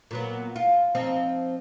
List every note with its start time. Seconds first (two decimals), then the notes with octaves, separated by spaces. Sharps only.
0.11 A#2 F#3 B3
0.56 F4
0.95 F3 C4 D#4